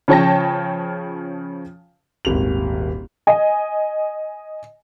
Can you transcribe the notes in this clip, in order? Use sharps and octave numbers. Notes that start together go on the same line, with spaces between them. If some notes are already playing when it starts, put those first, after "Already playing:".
C#3 F3 C#5 G5 A5 A#6
D#1 G#1 F7
D#5 G#5